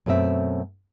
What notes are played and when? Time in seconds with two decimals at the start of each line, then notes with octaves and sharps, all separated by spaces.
0.06 F#2 B2 A3 C4 E5